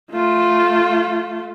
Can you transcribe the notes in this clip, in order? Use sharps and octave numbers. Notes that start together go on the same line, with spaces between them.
A3 F4